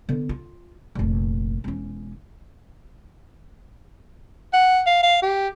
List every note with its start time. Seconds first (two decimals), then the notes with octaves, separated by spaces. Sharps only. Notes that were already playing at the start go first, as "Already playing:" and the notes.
0.09 D3 B3
0.29 F4
0.95 F1 A#1
1.64 E1 C#4
4.53 F#5
4.86 F5
5.03 F5
5.23 G4